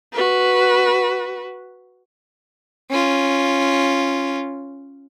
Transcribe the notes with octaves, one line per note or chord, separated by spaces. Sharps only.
F#4 B4
C#4 F4